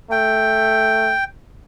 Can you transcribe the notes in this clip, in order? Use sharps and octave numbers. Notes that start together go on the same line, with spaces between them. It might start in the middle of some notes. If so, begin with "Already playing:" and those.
A3 G5